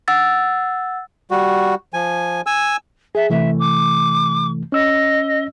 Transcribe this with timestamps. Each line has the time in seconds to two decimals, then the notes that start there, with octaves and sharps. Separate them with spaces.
0.08 F#5 E6 A6
1.31 G3 F#4
1.94 F3 G#5
2.46 G#5 E6
3.15 G#4 E5
3.30 C3 E3 A3 E5
3.59 D6
4.72 C#4 D#5 E6